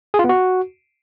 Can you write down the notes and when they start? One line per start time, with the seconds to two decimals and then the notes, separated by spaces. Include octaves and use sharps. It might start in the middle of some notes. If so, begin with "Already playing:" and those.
0.14 G#4
0.19 F4
0.24 B3
0.29 F#4